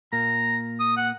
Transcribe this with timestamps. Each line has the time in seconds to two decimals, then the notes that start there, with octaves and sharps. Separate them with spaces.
0.13 A#2 A#3 A#5
0.80 D#6
0.97 F#5